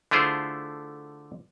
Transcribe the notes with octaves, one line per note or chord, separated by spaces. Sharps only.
D3 A3 E4 F4 G#4 C5